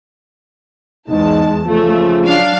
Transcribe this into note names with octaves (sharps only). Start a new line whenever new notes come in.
E2 G#2 G#3 D#4 A5
C#3 F3 A3
F#3 D4 F5